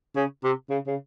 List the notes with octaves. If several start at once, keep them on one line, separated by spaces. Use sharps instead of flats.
C#3
C3
C#3
C#3